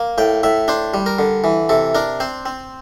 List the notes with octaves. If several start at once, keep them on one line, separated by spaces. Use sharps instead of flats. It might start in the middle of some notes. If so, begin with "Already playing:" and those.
Already playing: A#3
A2 G5
A2 E5
D4 C5
G3
A#4
D3
E3
C3 A4
D4 A#4
C4 C5
C4